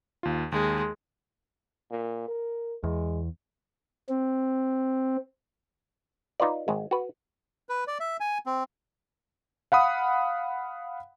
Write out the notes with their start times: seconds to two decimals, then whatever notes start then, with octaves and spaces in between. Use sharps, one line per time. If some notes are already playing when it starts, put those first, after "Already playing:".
0.23 D#2 F4
0.52 D#2 G#3
1.91 A#2
2.28 A#4
2.84 E2 G#3
4.09 C4
6.40 D#4 F4 B4 D5
6.68 G#1 G#3
6.91 F#4 B4
7.69 B4
7.87 D5
8.00 E5
8.20 G#5
8.46 C4
9.72 F5 F#5 B5 D#6